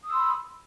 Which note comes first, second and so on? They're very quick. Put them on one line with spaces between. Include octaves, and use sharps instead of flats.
D#6 E6 C6 B5